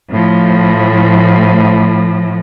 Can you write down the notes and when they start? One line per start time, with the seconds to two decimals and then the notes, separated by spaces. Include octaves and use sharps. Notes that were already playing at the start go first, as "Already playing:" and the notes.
0.11 A2 F3